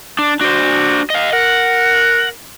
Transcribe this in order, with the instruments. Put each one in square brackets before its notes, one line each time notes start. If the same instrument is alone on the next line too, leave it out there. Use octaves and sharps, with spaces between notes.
[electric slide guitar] D4
[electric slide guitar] D4 C5 [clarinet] F#4
[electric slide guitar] D#5 F5
[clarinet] A#4 [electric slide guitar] F#5